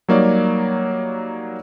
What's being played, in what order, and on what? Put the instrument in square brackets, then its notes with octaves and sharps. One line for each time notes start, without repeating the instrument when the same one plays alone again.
[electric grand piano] F#3 G3 A#3 D#4 C#5 D5